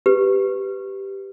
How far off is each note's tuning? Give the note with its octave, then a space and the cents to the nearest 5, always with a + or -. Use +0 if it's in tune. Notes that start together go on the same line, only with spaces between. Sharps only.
G4 +0 B4 +10